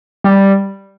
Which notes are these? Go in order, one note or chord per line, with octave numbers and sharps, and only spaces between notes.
G3